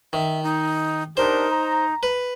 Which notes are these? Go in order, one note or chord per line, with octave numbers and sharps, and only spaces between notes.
D#3 E5
D#4
D4 D#4 G4 A#4 C5
A#5
B4